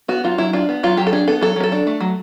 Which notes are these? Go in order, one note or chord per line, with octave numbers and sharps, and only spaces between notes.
B3 F#4
F#3 F4
F#3 E4
D4 F4
B3
F#3 F4
F#3 G4
A4
D4 G#4
B3 A4
F#3 A4
F#3 A#4
A4
D4
A3
F#3